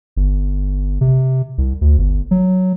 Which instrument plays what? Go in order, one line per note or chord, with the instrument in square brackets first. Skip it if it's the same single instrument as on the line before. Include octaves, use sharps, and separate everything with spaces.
[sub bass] G1
C3
C2
D2
G1
F#3